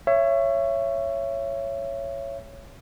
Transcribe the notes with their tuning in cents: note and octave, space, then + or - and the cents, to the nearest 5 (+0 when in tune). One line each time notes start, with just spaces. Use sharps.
C#5 +0 E5 +30